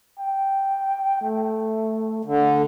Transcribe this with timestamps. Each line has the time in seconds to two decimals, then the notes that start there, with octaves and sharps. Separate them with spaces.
0.19 G5
1.21 A3
2.25 D3 A3